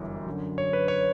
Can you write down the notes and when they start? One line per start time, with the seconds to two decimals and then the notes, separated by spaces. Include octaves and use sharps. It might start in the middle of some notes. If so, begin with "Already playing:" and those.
Already playing: G1 F#2 E3 G3
0.27 F#2 D3 F#3
0.58 C#5
0.73 B4
0.88 C#5